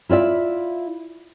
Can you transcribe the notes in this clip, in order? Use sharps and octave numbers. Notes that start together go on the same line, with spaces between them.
E4 F4 D5 E5